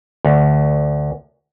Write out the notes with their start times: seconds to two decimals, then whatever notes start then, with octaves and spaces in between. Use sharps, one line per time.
0.25 D2